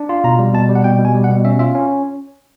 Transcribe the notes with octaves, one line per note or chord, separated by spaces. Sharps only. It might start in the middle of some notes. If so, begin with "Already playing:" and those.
Already playing: D4
F4
B2 A#5
G3
B2 A5
G3
F#5
B2 G5
B2
G#5
G3
F#5
B2
C#4 E5
F4 E5
C#4